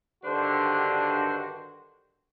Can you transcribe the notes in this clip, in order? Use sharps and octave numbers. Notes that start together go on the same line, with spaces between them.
G2 D3 D#3 D4 F#4 C5